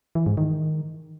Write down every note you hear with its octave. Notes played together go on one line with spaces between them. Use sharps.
E3
G#2
D#3